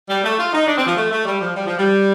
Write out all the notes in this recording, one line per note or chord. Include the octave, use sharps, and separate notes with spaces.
G3
A3
F4
D#4
D4
C4
F3
A3
A3
G3
F3
G3
F3
G3